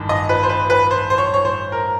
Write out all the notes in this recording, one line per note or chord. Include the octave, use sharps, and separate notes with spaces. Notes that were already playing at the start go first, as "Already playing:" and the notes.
Already playing: A1 G2 D#3
D#5
B4
C5
B4
B4
C5
C5
C#5
C#5
C5
A#4